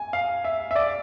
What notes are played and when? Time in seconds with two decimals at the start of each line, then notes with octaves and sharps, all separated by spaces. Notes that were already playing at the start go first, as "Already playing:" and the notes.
Already playing: G#5
0.13 F5
0.45 E5
0.71 E5
0.75 D5